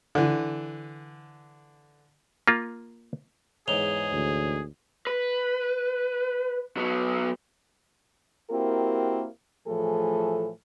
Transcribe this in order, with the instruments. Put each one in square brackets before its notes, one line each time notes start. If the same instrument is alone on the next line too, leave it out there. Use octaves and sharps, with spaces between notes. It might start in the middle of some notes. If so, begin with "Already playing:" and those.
[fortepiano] D3 E3
[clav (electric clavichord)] A#3 F4
[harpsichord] E2 G#2 [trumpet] G#4 [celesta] C#5 F7 G7
[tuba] D2
[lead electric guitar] B4
F#3 B3
[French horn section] A#3 C4 E4 F#4 G4 A#4
A2 E3 F3 A3 G#4 A4